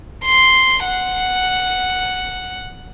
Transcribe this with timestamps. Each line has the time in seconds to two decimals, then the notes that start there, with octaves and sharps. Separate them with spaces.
0.25 C6
0.85 F#5